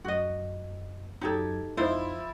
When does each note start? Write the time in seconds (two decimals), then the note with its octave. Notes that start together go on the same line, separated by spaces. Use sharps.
0.04 F#2 F#4 D#5
1.21 F#2 F#3 D#4 G4 A4 G#6
1.77 F2 F3 D#4 E4 C5